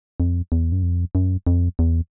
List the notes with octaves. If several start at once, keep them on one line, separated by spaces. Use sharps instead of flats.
F2
E2
F#2
F2
F#2
F2
E2